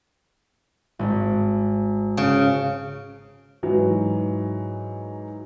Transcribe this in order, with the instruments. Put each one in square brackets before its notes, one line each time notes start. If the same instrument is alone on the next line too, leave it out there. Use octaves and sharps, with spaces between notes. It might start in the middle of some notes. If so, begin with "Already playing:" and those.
[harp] G#1
[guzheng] C#3 [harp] D7
[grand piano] G#2 E3 F#3